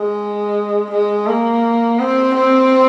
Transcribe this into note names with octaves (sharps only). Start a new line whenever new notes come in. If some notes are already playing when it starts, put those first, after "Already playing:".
Already playing: G#3
G#3
A#3
C4
C4